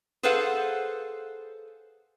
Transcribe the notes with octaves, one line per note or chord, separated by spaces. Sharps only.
G#4 A4 B4 C5 F5 F#5